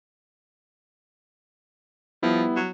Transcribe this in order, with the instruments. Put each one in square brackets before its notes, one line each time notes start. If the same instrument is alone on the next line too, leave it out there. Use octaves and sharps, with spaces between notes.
[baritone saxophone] F3 [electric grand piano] G3 B3 E4
[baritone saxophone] F#3